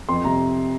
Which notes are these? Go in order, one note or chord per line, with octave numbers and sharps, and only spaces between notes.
F2 C6
C3 A#5